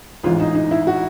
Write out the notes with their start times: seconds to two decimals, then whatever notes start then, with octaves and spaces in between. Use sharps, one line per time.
0.24 A1 G#2 E3 F4
0.40 D#4
0.55 D#4
0.71 E4
0.87 F#4